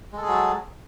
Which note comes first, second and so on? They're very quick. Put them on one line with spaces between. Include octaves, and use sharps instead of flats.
G#3 A4 G#4 F#3